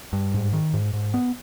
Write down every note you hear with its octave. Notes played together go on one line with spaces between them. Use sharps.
G2
G#2
D#3
G#2
G#2
B3